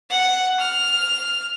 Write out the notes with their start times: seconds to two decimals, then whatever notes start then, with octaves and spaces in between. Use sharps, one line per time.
0.10 F#5
0.60 F6